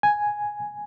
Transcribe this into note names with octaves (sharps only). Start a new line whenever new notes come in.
G#5